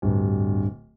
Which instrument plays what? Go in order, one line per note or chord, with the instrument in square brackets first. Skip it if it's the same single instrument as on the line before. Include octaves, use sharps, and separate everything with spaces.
[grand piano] D1 [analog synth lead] G2